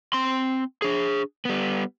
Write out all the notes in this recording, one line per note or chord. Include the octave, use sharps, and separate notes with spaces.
C4 C6
D4 G#4
G3 B3